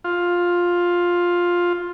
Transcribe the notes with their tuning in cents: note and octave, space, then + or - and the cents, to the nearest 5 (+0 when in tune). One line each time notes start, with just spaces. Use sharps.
F4 +10